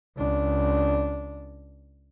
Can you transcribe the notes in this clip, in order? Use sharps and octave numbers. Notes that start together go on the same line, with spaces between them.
C#2 D4